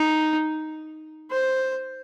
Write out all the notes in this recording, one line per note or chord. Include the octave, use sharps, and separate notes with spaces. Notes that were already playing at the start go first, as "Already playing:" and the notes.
Already playing: D#4
C5